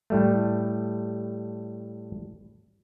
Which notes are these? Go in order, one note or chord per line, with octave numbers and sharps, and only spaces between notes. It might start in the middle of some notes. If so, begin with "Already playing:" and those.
A2 G3 A3